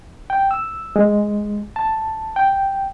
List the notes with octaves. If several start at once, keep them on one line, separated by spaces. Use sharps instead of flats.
G5
E6
G#3
A5
G5